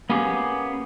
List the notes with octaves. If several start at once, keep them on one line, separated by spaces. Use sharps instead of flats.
A#3 B3 C#4 G4 G#4